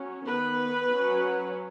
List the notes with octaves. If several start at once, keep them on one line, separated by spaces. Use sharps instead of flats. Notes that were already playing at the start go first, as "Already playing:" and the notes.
Already playing: F#3 C#4
D#3 B3 B4
F#3 C#4